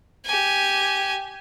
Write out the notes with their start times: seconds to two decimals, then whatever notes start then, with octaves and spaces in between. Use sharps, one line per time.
0.25 G4 G#5